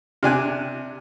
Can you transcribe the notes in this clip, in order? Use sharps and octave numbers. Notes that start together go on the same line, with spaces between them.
C3 D4 G#5 F#6